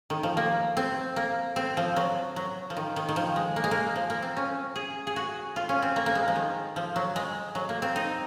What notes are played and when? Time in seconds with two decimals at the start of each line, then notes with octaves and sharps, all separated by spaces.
0.10 D#3
0.23 F3
0.37 A#3
0.77 C4
1.16 A#3
1.56 C4
1.77 F3
1.96 F#3
2.36 F#3
2.70 F3
2.77 D#3
2.96 D#3
3.09 D#3
3.16 F3
3.36 G#3
3.56 A#3
3.64 G#3
3.71 A#3
3.96 F3
4.10 A#3
4.22 C4
4.37 C#4
4.76 G#4
5.07 G#4
5.16 F#4
5.56 F4
5.69 C#4
5.82 C4
5.96 A#3
6.06 A#3
6.15 G#3
6.28 F3
6.36 D#3
6.76 F3
6.96 F#3
7.16 G#3
7.55 F#3
7.69 A#3
7.82 C4
7.96 D#4